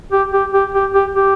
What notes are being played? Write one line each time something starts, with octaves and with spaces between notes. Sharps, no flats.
G4
G4
G4
G4
G4
G4